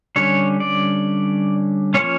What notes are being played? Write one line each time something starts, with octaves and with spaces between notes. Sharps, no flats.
D3 G3 C#4 C#5
D5
F3 A#3 C#4 C#5